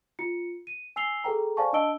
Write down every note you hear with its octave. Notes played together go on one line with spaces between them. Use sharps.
F4 C#7
D#7
G#5 E6 C7 F7 G7
G#4 A4 B4 G5 A#5
C5 D5 F5 G#5 A5 C#6
D4 D#5 A5 E6 D7 G7